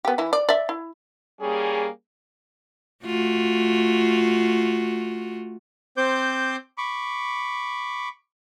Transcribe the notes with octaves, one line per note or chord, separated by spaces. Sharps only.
B3 G4
E3 E4
D5
D5 E5
E4
G3 A#3 C#4 G#4
A3 F4 F#4
C4 C5 D6 G6
B5 C#6 D6